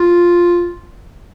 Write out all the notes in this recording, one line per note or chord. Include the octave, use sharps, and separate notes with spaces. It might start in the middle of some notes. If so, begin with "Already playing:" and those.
Already playing: F4